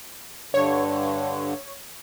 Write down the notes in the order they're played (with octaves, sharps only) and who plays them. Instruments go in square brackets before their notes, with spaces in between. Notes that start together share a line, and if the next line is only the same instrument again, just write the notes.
[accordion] G2 D3 [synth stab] C#5